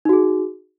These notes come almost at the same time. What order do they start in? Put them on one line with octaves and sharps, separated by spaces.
D#4 F#4 G#4